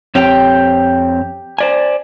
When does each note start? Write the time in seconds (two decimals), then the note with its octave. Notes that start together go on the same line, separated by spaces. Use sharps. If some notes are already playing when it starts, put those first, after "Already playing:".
0.15 F2 C4 G4 C#5 G5
1.58 C5 D5 G#5